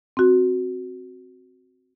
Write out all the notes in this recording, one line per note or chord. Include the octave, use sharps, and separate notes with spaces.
C4 F#4